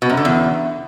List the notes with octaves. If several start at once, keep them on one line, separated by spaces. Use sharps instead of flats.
B2
F#2
D3
E2